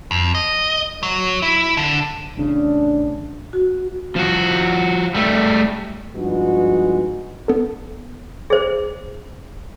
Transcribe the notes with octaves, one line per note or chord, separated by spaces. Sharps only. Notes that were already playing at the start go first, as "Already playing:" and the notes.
F2
D#5
F#3
E4
D3
A1 C#3 D4
F#4
F3 F#4
G3 A3
G2 F3 G#3 B3 D#4 F#4
B3 A4
G#4 C5